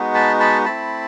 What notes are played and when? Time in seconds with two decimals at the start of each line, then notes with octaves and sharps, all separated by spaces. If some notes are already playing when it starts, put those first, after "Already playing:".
Already playing: G#3 B3 D#4 F#4
0.15 A5 B5
0.40 A5 B5
0.65 A3 C4 E4 A5 B5